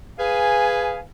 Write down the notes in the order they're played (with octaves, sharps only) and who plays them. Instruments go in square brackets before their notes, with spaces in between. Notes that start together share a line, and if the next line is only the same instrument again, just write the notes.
[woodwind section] G#4 B4 F5 G#5